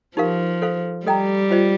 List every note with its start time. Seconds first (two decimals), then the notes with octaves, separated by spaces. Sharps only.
0.17 F3 D#4 G4 A#4 F5
0.62 A4 C5 F5
1.06 G3 A4 D#5 G5 A#5
1.51 F4 C5 D#5